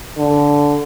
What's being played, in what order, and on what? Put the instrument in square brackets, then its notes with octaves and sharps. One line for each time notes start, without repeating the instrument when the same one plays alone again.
[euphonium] D3